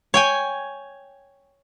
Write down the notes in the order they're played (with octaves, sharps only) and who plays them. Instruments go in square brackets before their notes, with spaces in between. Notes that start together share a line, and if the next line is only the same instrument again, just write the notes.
[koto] C#5 G5 G#5